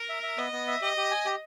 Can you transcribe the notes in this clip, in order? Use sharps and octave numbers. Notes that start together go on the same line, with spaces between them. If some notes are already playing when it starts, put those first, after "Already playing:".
Already playing: A#4
E5
E5
B3 D#5
B3
E5
G4 D#5
G4
G#5
G4